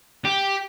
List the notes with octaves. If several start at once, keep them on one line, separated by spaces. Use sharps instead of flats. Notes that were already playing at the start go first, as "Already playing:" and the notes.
G4